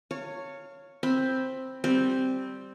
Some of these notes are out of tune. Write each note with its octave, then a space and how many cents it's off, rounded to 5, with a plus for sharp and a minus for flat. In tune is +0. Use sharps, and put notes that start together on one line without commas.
C#5 +0 F5 +0 A5 +40
C4 +5 B5 +0
G3 +0 C4 +0